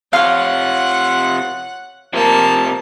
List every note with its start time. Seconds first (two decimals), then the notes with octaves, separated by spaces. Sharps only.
0.13 C3 F4 C#5 F5 F#5
2.13 C3 F3 A#3 A5